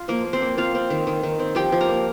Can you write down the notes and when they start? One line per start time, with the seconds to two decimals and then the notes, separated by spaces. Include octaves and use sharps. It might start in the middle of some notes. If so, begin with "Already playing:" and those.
Already playing: F4
0.08 F3 A#3 A#4
0.25 A#3
0.33 C4 C5
0.41 A#3
0.57 C4 F4 F5
0.75 C4
0.90 D#3
1.07 D#3
1.23 D#3
1.39 C4
1.55 F3 G4 G5
1.72 F3
1.81 A#4 A#5
1.89 A#3